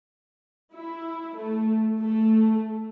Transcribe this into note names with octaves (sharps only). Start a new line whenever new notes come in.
E4
A3
A3